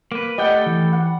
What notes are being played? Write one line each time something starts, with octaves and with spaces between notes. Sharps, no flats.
A#3 B4
G3 A3 A4 D#5 F#5 G5
E3
F#5